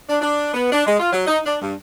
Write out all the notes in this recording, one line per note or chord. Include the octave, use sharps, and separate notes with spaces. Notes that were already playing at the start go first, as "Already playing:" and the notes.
D4
D4
B3
D4
G#3
F4
F#3
D#4
D4
G2